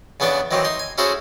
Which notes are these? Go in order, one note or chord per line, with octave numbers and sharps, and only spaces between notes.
E2 C#3 B3 D4 D5
D#3 E3 F#3 C4
D#4 C6
G#5
C#4 E4 F#4 G#4 A4 C5